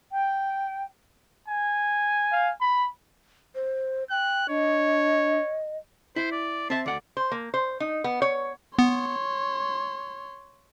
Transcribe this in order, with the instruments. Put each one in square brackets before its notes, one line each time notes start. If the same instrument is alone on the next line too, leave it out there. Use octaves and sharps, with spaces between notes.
[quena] G5
[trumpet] G#5
[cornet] F5
B5
[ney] C5
[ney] G5 [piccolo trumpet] F#6
[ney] D4 [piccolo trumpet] C#5 [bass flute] D#5
[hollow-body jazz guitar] E4 [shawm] C5
[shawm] D5
[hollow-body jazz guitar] C4 E5 [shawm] A5
[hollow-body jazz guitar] D2 F#5 [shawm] D5
[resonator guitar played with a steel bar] C5
A#3
C5
D#4
B3
C#5
[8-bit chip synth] B3 [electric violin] C#5 C6